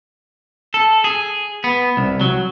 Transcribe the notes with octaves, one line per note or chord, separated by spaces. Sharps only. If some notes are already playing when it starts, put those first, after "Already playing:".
A4
G#4
B3
C2
F#3